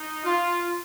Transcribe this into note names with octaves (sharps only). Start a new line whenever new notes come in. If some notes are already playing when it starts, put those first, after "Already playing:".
Already playing: D#4
F4